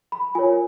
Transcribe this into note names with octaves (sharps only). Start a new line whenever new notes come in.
B5
F4 A#4 C#5 G#5